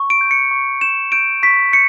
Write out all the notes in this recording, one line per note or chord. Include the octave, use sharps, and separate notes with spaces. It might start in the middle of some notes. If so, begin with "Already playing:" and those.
Already playing: C#6
D7
G6
C#7
C#6
G6 E7
G6 D7
C#6 B6
G6 C#7